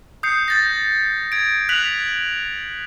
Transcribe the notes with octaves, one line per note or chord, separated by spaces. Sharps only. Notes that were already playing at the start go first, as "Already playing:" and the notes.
D#6 G6 C7 C#7
G6 A6 A#6
G#6 D7
F#6 B6 F7 F#7